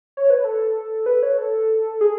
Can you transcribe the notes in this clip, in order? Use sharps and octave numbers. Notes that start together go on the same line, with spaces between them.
C#5
B4
A4
B4
C#5
A4
G#4